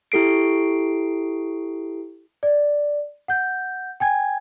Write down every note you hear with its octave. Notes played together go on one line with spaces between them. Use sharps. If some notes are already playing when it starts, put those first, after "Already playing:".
E4 G4 A4 C7 D7
D5
F#5 G6
G5 G#5 G#6